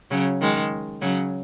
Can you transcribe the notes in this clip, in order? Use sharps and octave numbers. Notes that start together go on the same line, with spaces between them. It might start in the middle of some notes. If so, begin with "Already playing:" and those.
C#3 F#3
D#3 G#3
C#3 F#3